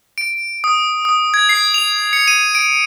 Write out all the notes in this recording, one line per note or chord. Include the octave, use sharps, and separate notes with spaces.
D7
D#6
D#6
G#6
C7
F7
C#7
D#7
D7